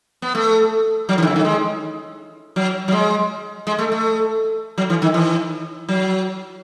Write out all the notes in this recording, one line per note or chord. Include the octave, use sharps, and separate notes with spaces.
B3
A3
F#3
E3
D#3
C#3
D#3
G#3
F#3
F#3
G#3
G#3
A3
A3
F#3
E3
D#3
E3
F#3